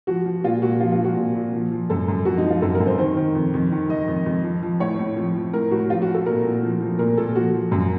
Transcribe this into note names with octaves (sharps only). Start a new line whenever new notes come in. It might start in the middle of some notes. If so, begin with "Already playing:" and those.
F3 F#4
F3
A#2 F4
A#2 F#4
F3 F4
F4
F3
F#4
A#2
A#2
F3
F3
F#2 A4
F#2
F3 F#4
D#4
F3
F4
F#2 A4
A#4
F#2
C5
D#3 C5
D#3
F2
F2
D#3
D#3 D#5
F2
F2
F3
F3
A2 C#5
A2
F3
F3
A2 A#4
A2 F#4
F3 F4
F#4
F3
A4
A#2 A#4
A#2
F3
F3
A#2 A#4
A#2 A4
F3 F#4
F3
F#2